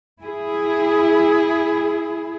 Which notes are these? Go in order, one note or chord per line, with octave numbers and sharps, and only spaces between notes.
E4 G#4